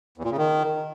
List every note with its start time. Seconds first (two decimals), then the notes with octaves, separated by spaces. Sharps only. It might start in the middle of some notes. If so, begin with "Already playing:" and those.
0.17 E2
0.24 A#2
0.31 C#3
0.37 D#3